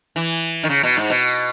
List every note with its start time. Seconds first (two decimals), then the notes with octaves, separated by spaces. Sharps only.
0.16 E3
0.63 D#3
0.69 C#3
0.83 B2
0.97 G#2
1.10 B2